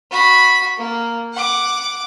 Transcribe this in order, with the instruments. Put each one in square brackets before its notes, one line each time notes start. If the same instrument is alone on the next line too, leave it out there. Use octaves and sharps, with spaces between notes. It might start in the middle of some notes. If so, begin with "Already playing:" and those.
[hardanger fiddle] F#4 B5
A#3
F#5 D6